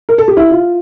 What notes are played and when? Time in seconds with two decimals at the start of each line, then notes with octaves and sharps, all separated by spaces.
0.09 A#4
0.18 A4
0.28 G4
0.37 E4
0.51 F4